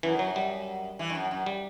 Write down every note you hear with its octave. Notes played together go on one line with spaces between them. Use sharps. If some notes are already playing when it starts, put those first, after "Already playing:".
F#2 E3
F#3
G3
E3
G2
F#2
F#2
G3